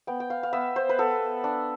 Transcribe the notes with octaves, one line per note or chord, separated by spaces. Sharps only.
B3 G5
G5
F5
F5
B3 E5
C5
B4
B3 A4
D4